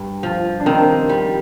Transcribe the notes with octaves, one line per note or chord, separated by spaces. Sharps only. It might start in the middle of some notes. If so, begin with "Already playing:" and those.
Already playing: G2
F3
D4
D#3 C4
G3